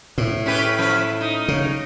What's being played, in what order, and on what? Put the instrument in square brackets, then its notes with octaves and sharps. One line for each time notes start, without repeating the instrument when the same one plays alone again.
[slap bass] A2
[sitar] C#4 G4 B4
F3 C#4 B4
E4
D#4
[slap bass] C#3